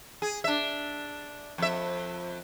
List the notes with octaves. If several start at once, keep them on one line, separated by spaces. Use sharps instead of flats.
G#4
D4 E5
F2 E5